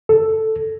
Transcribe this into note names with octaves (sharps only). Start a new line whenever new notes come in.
A4